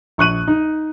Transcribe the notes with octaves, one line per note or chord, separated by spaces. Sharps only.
A#1 C#6 F#6 D#7 F#7
D#4